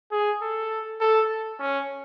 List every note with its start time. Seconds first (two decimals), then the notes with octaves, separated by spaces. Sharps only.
0.12 G#4
0.42 A4
1.01 A4
1.60 C#4